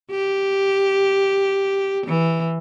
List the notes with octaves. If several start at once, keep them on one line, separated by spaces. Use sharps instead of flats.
G4
E3